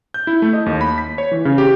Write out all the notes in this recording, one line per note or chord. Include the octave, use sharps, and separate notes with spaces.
G6
E4
A3
D#5
D#2
B5
B6
C#5
E3
C#3
G4